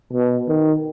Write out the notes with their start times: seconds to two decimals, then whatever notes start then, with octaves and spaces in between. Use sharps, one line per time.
0.13 B2
0.48 D#3